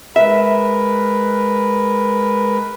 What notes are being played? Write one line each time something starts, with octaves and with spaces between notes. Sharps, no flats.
G#3 A#4 B4 E5